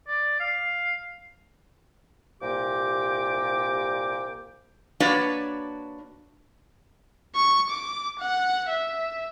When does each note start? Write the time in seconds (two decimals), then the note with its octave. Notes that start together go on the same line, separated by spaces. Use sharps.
0.08 D5
0.40 F5
2.41 C2 A#2 A#3 G4 G5 D6
5.00 A#3 D4 F#4 B4 C#5 D5
7.35 C#6
7.70 D6
8.20 F#5
8.69 E5